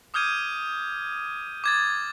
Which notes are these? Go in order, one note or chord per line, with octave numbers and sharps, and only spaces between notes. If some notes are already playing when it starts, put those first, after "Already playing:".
D6 D#6 F6 G6 G#6 D#7
D6 G#6 A6